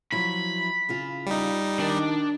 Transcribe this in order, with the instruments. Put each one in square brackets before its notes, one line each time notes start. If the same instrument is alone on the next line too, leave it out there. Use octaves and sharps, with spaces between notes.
[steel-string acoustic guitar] F3 F#3 E4 [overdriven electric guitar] B5
[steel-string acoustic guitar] C#3 E4 F4
[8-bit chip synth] G3 D#4
[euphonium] D#3 [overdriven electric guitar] D4 [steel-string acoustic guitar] G4